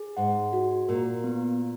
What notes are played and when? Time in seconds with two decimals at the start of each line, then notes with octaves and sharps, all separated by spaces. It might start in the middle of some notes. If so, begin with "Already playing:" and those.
Already playing: G#4
0.17 G#2 F#5
0.53 F#4
0.89 A#2 A#4
1.24 B3